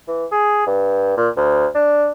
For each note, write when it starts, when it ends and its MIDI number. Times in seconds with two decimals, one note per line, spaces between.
0.08 0.25 52
0.32 0.62 68
0.67 1.13 43
1.17 1.29 46
1.37 1.66 38
1.75 2.11 62